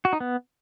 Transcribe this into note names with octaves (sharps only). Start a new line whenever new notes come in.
F#4
D#4
B3